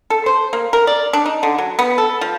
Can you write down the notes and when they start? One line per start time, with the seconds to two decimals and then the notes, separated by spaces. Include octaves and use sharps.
0.10 A4
0.26 C5
0.53 A#3
0.73 A#4
0.87 D5
1.13 D4
1.26 D#4
1.43 D3
1.58 F#3
1.79 B3
1.98 A4
2.21 F3